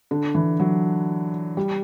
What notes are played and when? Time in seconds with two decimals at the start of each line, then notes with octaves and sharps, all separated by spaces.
0.11 D3
0.35 E3
0.60 F#3
1.57 G3